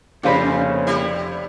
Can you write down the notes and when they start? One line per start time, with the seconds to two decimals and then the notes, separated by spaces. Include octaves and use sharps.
0.23 F1 F#2 A#2 C#3 F4 B4 C5 B5
0.87 C3 G3 E4